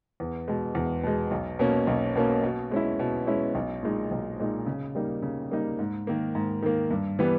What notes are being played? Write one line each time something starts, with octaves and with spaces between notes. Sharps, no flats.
E2
B2 G#3
E2
B2 G#3
B1
B2 A#3 C#4
B1
B2 A#3 C#4
B2
G#3 C#4 E4
B2
G#3 C#4 E4
B1
A#2 G#3 D#4
B1
A#2 G#3 D#4
C#3
G3 A#3 D#4
C#3
G3 A#3 D#4
G#2
D#3 A#3
G#2
D#3 A#3
G2
E3 G3 B3